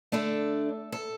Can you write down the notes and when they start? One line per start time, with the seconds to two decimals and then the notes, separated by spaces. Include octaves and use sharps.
0.12 D3 A3 D4 A4
0.92 A4